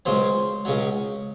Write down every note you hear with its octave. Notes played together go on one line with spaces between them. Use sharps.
C#2 C#3 F#3 C5
C#2 C#3 F#3